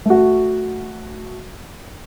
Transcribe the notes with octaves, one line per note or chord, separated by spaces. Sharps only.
A3 F#4